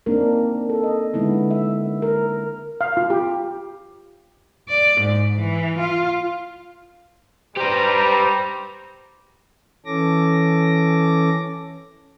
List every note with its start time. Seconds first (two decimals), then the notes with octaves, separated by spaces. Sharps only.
0.06 A#3 C4 D4 D#4 A#4
0.69 A4
0.84 D#5
1.14 D3 G#3 B3 D#4 E4
1.51 E5
2.02 A#4
2.81 F5
2.97 F4
3.10 G4
4.69 D5
5.01 G#2
5.37 E3
5.78 F4
7.57 G3 G4 B4 C5 A#5
9.85 E3 C#4 A4 D6 A#6